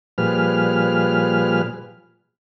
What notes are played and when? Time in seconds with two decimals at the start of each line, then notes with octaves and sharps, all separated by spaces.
0.18 A#2 F3 G3 G#4 B4 F6